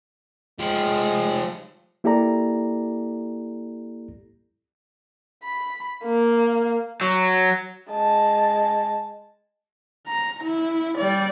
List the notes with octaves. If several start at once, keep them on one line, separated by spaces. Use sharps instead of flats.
F3 G#3 G4
A#3 E4 G4 A4 D5 A#5
B5
A#3
F#3
G#3 A5
A#5
E4
G3 D5